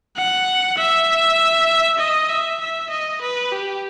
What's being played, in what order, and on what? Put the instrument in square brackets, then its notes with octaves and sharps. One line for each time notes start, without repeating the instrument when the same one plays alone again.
[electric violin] F#5
E5
D#5
E5
E5
D#5
B4
G4